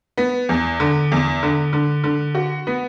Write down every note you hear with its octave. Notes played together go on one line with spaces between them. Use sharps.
B3
E2
D3
E2
D3
D3
D3
F#4
B3